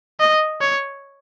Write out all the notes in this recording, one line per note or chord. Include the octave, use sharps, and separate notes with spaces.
D#5
C#5